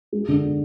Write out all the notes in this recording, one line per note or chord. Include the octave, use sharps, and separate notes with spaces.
G#3
D3